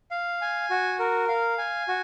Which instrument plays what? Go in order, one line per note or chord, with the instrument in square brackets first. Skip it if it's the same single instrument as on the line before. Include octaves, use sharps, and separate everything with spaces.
[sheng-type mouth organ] F5
G#5
F#4
A#4
F5
G#5
F#4